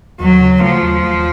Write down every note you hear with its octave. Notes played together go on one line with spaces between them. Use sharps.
D#2 F#3
C#3
F3 A3
D#2
D#2